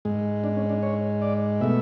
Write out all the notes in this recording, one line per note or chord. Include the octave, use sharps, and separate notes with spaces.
G#2 G#3
D4
C#4
D4
C#5
D5
B2 A3 E5